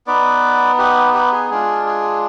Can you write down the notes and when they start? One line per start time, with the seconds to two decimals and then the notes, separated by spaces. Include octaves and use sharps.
0.07 B3 D#4 B4 D5
0.79 G4 B4
1.14 G4 B4
1.32 G#4
1.50 G#3 D4 F4 G#4
1.86 G#4